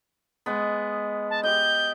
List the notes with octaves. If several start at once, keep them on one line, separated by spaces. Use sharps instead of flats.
G#3 B3
A5
G4 D#5 G6